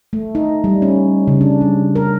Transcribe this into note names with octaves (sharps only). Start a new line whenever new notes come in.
A3
D#4
G3
C#4
C#3
D4
G3
A#4